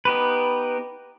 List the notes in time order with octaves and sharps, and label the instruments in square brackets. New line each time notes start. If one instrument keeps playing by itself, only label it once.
[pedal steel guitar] B3 D#4 G4 B4